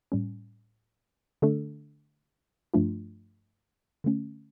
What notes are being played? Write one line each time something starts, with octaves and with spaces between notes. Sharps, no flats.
A2 G3 C#4
D3 A3 D4 A4
G2 F3 A3 D4 F4
D3 A3 C#4